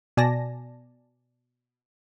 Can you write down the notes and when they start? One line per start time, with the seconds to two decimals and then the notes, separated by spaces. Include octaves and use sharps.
0.17 B2 D5 G#5 A5 A#6